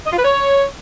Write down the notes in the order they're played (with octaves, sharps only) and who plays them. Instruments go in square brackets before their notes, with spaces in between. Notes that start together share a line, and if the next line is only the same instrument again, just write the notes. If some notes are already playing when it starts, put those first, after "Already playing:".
[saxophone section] D#5
F4
B4
C#5